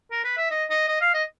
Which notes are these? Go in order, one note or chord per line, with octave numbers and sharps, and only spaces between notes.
A#4
B4
E5
D#5
D#5
D#5
F5
D#5